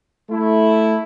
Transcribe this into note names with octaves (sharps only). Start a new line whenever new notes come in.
A3 E4